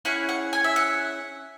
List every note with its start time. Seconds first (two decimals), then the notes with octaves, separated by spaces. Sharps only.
0.05 C#4 E4 G#4 F#5
0.29 F#5
0.53 G#5
0.64 E5
0.76 F#5